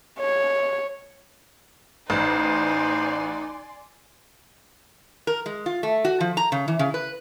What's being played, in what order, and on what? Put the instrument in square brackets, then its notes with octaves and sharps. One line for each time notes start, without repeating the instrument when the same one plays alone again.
[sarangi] C#5
[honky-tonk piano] A1 [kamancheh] D#4 [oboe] C5 [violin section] D5 G#5 C6
[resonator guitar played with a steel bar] A#4
G#3
F4
A3
F#4
F3
A#5
C#3
E3
C#3
B4